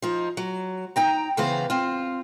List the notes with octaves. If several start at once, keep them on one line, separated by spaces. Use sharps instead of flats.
F3 D#4
F#3
D#4 G5 A#5
C#3 E3 B3 C5 F5
C4 F4